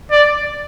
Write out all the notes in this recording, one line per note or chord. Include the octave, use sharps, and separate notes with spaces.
D5